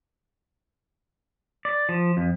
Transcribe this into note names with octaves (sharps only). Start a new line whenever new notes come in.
D5
F3
F2